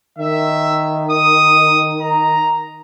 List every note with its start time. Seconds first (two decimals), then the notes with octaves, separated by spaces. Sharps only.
0.19 D#3 E5
1.11 D#6
2.01 A#5